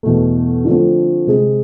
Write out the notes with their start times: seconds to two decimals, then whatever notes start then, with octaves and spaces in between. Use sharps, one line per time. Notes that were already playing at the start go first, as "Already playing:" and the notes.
0.03 E2 B2 A3
0.65 D3 F3 A3 C4
1.27 C3 G#3 C4 G#4